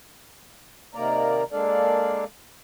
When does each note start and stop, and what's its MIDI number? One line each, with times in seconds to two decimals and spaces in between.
0.95 1.43 48
0.95 1.43 51
0.95 1.43 58
0.95 1.43 70
0.95 1.43 74
0.95 1.43 82
1.52 2.24 56
1.52 2.24 58
1.52 2.24 62
1.52 2.24 69
1.52 2.24 74
1.52 2.24 77